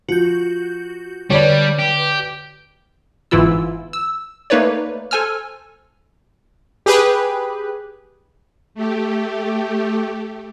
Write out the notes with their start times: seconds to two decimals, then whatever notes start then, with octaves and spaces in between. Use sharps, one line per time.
0.09 F3 F#4 G6
1.30 D3 G3 B4 C#5 D5
1.79 G4
3.31 G1 G#2 E3 E4 F4 E6
3.93 E6
4.50 A3 A#3 D#4 B4 C#5 D5
5.11 A4 C5 G#5 E6 F6
6.86 G4 G#4 B4
8.75 A3 G4